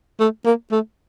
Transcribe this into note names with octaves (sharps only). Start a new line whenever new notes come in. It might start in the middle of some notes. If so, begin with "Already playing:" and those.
A3
A#3
A3